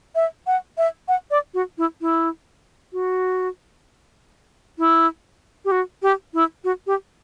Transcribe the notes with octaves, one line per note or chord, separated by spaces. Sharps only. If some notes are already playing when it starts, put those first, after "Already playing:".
E5
F#5
E5
F#5
D5
F#4
E4
E4
F#4
E4
G4
F#4
G4
E4
F#4
G4